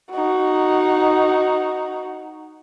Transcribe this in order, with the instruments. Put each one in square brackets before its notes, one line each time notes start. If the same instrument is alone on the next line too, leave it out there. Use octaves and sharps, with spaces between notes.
[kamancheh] D#4 F#4